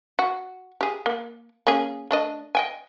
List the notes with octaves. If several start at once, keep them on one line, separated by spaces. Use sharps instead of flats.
F#4
G4 G#4
A#3
A#3 C#4 G#4
A3 D4 D#5
D#5 G5 G#5